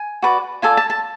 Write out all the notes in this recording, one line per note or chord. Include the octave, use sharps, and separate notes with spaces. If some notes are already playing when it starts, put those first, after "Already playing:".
Already playing: G#5
F#4 B4 D5
F4 A4 D5 G#5
A5
A5